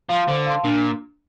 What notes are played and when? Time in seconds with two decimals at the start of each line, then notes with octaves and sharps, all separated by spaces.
0.09 F3 F5 A5 C6
0.28 D3 C5
0.46 F5 A5 C6
0.64 A#2 D4